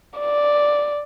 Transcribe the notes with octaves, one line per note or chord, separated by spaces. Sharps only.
D5